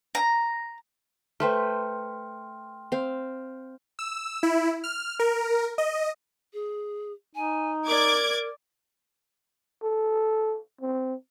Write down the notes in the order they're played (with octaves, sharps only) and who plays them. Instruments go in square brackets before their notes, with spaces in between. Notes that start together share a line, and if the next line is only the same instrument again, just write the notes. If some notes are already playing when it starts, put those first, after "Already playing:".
[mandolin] A#5
[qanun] A3 B4 C5 [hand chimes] G5 C6 F6
[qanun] C4 F5
[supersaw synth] E6
E4
F6
A#4
D#5
[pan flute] G#4
[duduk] D#4 [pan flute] G#5
[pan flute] A#4 [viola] D5 [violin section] D6 G#6
[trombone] A4
C4